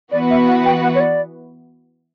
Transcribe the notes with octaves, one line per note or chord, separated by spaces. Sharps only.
E3 B3 F#4 B4 D5
E5
F#5
G5
F#5
C#5
D5